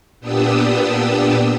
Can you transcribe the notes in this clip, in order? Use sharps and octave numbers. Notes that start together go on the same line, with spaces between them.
A#2 B3 D4 G4 D#6 E6